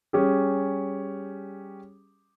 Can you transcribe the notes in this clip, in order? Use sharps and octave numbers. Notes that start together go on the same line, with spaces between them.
G3 C#4 G4 G#4